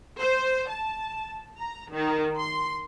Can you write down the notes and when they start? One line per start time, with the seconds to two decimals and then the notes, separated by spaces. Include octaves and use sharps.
0.19 C5
0.69 A5
1.58 A#5
1.91 D#3
2.37 C6